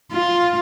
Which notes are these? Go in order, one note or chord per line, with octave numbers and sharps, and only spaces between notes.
F4